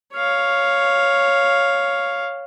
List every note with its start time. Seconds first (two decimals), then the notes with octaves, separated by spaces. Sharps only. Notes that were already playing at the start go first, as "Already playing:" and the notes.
0.14 C#5 F5